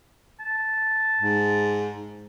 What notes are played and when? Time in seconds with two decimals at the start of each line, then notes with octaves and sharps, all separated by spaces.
0.40 A5
1.20 G#2